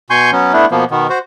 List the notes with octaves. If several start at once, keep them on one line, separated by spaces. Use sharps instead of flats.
B2 G#5 C6 C#6 G6
F#3 B3 C#4
A3 B3 D4 E4
B2 F3 A#3 B3
B2 D#3 B3
F#4 C5